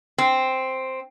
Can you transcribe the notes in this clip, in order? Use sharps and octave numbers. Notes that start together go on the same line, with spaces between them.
C4